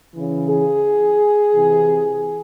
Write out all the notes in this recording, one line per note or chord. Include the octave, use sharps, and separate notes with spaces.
C#3 E3
G#4
C3 E3